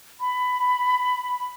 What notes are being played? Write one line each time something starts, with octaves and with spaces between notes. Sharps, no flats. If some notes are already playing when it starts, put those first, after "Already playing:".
B5